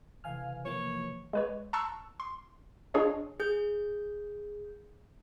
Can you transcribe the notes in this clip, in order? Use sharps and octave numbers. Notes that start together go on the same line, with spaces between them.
C3 E3 A3 F5 G#5 F6
F3 A#3 C#5
G#3 B4 C#5
A5 A#5 C6 C#6 E6 F#6
C6
D4 F4 G#4 C#5 D#5
G#4 G6